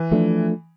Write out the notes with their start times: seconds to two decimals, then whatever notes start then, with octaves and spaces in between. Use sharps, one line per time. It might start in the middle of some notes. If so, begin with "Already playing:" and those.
Already playing: E3
0.11 F3 A3 D4